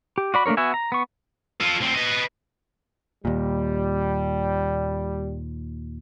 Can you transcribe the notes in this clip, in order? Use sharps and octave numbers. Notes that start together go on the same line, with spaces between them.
G4
F#4 D5 B5
A3 A#3 D4 A#4 C#5
B3 F#4 E5 G#5
A#5
B3 C#6
F4 A4
D2 C4
B4 D#5
D#2 A#2 G3